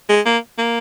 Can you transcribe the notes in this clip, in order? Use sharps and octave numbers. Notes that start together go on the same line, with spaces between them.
G#3
A#3
A#3